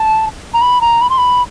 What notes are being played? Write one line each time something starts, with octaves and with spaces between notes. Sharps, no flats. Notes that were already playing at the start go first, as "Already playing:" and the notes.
Already playing: A5
A#5
B5
A#5
B5
C6
B5